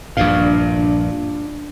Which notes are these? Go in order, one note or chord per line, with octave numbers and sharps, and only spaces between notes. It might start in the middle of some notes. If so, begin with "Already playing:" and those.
A#1 G2 A#2 D4 F5